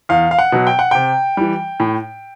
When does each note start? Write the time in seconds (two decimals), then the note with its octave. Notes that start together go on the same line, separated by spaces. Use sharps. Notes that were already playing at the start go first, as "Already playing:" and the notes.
0.09 E2 F5
0.31 F5
0.39 F#5
0.52 B2 F#3
0.67 G5
0.79 F#5
0.91 C3 G5
1.37 E3 G3
1.80 A2